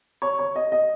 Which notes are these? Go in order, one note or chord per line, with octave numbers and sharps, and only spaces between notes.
C#5
C#5
D#5
D#5